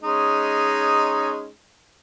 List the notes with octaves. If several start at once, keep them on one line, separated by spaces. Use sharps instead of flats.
G#3 C#4 D#4